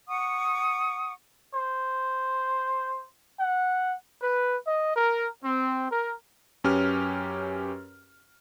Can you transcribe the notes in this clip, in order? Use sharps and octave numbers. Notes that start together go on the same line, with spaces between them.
F#5 C#6 D#6
C5
F#5
B4
D#5
A#4
C4
A#4
F#2 C#4 G4 B4 F6